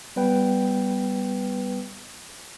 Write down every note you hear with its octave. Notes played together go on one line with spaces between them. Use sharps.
G3 B3 B4 G5